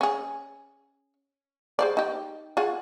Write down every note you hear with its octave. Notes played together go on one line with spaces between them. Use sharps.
C#4 G#4
G#4 C5 D5
D#4 G4
F4 F#4 G#4